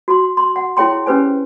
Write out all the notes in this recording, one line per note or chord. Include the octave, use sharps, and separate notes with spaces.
F#4 C6
C6
F#5
E4 G#4 C#5 G5 C6
C#4 G4 B4 C5 G#5